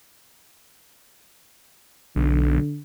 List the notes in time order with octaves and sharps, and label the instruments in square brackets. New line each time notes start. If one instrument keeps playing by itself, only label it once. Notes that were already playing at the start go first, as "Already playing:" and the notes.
[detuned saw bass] B1 [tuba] D3